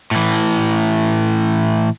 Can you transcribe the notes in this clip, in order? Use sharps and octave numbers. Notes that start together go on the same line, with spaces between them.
A2 E3